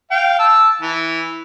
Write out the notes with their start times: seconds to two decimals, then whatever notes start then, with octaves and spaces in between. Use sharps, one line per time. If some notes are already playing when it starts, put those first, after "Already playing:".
0.11 F5 G5
0.39 A5 E6
0.81 E3